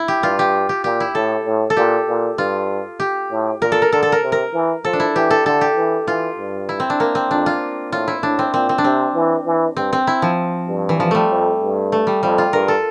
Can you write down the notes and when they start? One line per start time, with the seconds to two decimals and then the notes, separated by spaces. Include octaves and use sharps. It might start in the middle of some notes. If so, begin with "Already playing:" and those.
Already playing: E4
0.08 G4
0.23 G2 F4
0.39 G4
0.69 G4
0.84 A#2 G4
1.00 E4
1.15 A2 A4
1.45 A2
1.70 A4
1.77 A#2 G4
2.08 A#2
2.38 G2 F4
3.00 G4
3.31 A2
3.61 A#2 A#4
3.72 A4
3.82 A#4
3.92 D3 A4
4.03 A4
4.12 A#4
4.23 C3
4.32 A#4
4.53 E3
4.85 F3 A4
4.93 D4
5.00 E4
5.15 E3 G4
5.31 A4
5.46 D3 A4
5.61 G4
5.77 E3
6.08 E3 F4
6.38 G2
6.69 E4
6.80 C4
6.90 D4
7.00 A#3
7.15 C4
7.30 F2 D4
7.46 F4
7.92 A2 F4
8.08 E4
8.23 A2 D4
8.39 C4
8.54 A#2 C4
8.69 C4
8.78 D4
8.84 C3 C4
9.15 E3
9.46 E3
9.77 G2 C4
9.93 C4
10.07 E4
10.22 F3
10.68 G2
10.89 E3
11.00 F3
11.11 G3 A3
11.30 F2
11.61 G2
11.92 A3
12.07 G3
12.22 F2 G3
12.38 F4
12.53 G2 A#4
12.68 A4